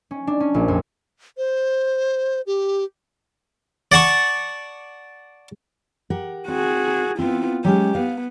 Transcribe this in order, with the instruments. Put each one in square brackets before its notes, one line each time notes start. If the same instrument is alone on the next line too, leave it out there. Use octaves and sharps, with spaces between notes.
[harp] C#4
D4
C#4
A#1
F2
[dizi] C5
G4
[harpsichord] D5 F#5 A5 C#6
[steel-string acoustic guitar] G4 A#4 F#5
[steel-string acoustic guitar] C4 [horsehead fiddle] F#4 G#4
[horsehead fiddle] B3 F4 [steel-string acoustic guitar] C4 E4
[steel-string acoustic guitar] F#3 G#3 C#4 [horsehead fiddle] G4
[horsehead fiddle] B3 [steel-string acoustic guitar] F5